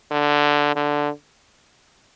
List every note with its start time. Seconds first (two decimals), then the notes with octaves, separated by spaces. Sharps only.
0.11 D3
0.75 D3